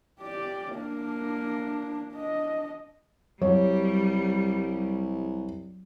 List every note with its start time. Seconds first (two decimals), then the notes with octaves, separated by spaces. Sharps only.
0.20 G4 D5
0.73 A#3 D4
2.12 D4 D#5
3.42 C2 F#3 G3 C#5